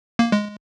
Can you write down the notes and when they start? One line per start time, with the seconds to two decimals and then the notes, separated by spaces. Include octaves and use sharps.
0.19 A#3
0.32 G#3